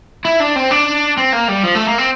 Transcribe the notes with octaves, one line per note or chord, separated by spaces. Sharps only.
E4
D4
C4
D4
C4
A#3
G3
F3
A3
A#3
C4